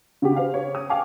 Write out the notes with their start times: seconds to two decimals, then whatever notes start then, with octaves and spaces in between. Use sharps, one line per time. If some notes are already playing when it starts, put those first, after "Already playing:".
0.22 C#3 F#4 G4
0.36 C5 F5
0.54 C#5
0.75 D#6
0.90 F5 G5 G#5 C#6 D6